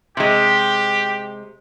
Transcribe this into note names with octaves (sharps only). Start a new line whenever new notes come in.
C3 G#3 G4